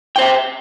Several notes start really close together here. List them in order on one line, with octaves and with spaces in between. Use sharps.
G5 C5 E5